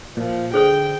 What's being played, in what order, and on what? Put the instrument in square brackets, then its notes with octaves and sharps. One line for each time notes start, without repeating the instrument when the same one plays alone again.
[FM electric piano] A#2 [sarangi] F3
[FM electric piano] D3 [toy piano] G#4 C5 D#6 [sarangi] G5